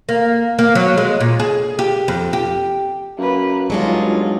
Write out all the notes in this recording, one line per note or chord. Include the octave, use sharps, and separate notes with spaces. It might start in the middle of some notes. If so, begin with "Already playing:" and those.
A#3
A#3
F#3
G#3
A#2
G#4
G4
F2
G4
F#2 A#3 B4
G1 F#3 G#3 D4 D#4 F4